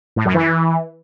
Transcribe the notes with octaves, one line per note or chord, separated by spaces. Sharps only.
A2
F#2
E3